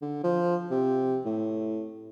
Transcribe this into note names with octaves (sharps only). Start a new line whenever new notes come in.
D3
F3
C3
A2